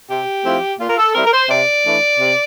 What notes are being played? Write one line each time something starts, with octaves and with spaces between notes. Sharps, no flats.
C3 G4
F3 A3 C4 E4
A#2 F4
A#4
A4
G3 C4 E4 A#4
A#4
C5
C3 D5
E3 A3 D4
C3